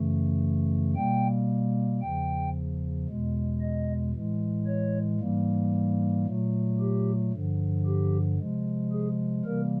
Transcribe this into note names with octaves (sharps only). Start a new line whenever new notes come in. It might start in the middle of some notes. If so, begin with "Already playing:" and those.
Already playing: F#2 C#3 E3 A3
B2 G3 A#3 G5
E2 C#3 F3 G5
E2 B2 G#3
D#5
A2 E3 G#3
C#5
G#2 E3 G3 A#3
A#2 F#3 A3
G4
G2 D3 F3
G4
C3 F3 G#3
G#4
C3 E3 G3 A#3 A#4